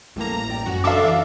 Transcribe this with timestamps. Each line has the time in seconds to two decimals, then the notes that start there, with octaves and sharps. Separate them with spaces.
0.16 A1 G3 A3 A#3 A#5
0.49 D5 G5
0.66 F#2 C#4 F#4
0.84 D4 A4 E5 F5 D6
1.04 E3